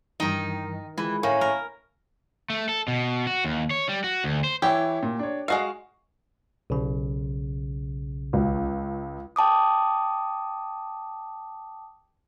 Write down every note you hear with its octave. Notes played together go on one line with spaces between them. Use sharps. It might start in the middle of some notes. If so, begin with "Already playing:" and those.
G2 D#3 E3 D#4 G5
E3 G#3 F4 G#4
A2 A#3 C#4 C#6
A#4
A3
A4
B2
F#4
D#2
C#5
G3
F#4
D2
C5
E3 E4 G4 C#5
A#2
D4 C#5
G#3 F#4 D#5 F5 C7
B1 C#3
C#2
G5 A5 D6 D#6